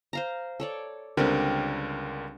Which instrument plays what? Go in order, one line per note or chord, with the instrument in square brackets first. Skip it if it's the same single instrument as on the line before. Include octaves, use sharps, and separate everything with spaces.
[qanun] C5 F5 A#5
A4 C#5 D5
[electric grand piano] C#2 D3 A#4 [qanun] G3 C4 D4